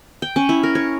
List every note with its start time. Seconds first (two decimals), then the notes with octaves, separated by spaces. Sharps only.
0.22 G5
0.36 C#4
0.49 E4
0.63 A#4
0.75 C#5